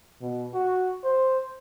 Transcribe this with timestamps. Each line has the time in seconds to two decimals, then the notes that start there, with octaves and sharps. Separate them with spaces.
0.21 B2
0.54 F#4
1.04 C5